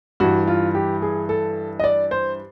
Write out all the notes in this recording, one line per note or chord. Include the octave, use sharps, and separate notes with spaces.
G2 E3 F#4
F4
G4
G#4
A4
D#5
D5
C5